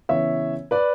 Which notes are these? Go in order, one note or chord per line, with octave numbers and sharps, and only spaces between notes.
C#3 E3 B3 C#5 E5
B4 D5